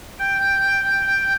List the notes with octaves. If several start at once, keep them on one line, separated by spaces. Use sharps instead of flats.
G5